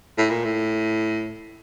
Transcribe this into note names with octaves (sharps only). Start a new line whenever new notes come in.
A2
A#2
A2